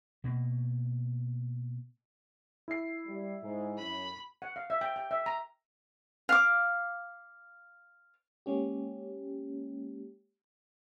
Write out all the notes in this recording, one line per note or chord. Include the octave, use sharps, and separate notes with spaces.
B2 A#3
E4 C7
G3
G#2
F#2 B5
F#5
F5
E5
G5
G5
E5
A#5
F5 D6
G#3 A#3 C#4 G4